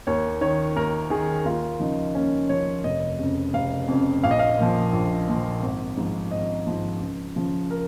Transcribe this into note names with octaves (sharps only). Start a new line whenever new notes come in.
D#2 C#5
D#3 C#5
D#2 A#4
D#3 G#4
D#2 F4
C#3 F3 D#4
D#2 C#4
C#3 F3 C#5
F1 D#5
F2 C#3
F1 F5
F2 C#3
A#1 F5
D#5
F5
A#2 F3
A#1
A#2 F3
G#1
G#2 F3
G#1 D#5
G#2 F3
C#2
C#3 F3
A#4